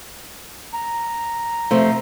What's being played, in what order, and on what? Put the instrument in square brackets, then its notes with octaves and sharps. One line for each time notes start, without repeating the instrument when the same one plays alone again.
[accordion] A#5
[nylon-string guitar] C3 F3 A3